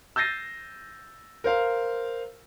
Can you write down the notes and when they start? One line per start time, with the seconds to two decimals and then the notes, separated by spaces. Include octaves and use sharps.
0.16 E6 G6 A6 A#6 C7 D#7
1.44 A#4 C5 F5